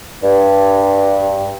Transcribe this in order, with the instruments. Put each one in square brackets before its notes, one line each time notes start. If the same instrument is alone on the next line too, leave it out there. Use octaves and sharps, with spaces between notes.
[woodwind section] G2